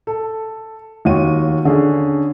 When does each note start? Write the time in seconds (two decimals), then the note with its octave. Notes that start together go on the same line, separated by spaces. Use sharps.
0.07 A4
1.05 D#2 F4 F#4 C#5 D#7
1.65 D3 C#4 G#4